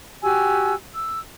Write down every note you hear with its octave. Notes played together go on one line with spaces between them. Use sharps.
F#4 G4 G#5 E6
E6